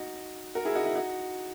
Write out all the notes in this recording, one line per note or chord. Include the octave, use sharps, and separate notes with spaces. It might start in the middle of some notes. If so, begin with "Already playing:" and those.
Already playing: D#4 F#4
F#4 A#4
E4 G#4
D#4 F#4
E4
D#4 F#4